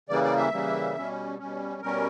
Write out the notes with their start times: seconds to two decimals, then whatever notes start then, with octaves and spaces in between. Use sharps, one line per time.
0.09 C#3 E3 G3 A#3 D5
0.24 D5
0.38 E5
0.52 C#3 E3 G3 A#3
0.95 B2 G3 C#4
1.39 B2 G3 C#4
1.82 B2 G3 C#4 A#4